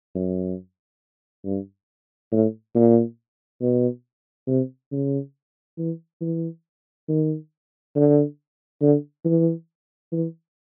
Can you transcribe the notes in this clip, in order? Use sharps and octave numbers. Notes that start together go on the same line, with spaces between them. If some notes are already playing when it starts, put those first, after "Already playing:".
F#2
G2
A2
A#2
B2
C3
C#3
E3
E3
D#3
D3
D3
E3
E3